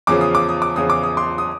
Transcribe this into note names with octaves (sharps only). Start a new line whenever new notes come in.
E2 C#3 F3 D6
D#6
D6
D#6
D6
E2 C#3 F3 D#6
D6
D#6
C6 D6
D#6